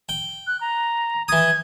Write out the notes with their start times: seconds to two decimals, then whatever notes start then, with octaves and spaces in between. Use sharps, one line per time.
0.09 G5
0.47 F#6
0.61 A#5
1.28 E3 D#6 G#6